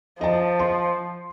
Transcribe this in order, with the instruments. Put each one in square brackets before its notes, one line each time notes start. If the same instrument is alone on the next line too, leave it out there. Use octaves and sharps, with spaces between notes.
[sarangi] F3 [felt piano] D#5 A5
[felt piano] C6